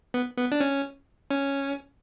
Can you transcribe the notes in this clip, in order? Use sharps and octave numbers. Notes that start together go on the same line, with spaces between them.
B3
B3
D4
C#4
C#4